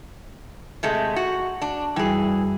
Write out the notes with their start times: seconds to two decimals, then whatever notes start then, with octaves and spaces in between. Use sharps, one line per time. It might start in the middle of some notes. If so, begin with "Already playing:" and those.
0.83 C3 G#3 A3
1.16 F#4
1.62 D4
1.96 F#2 E3 G3 G#4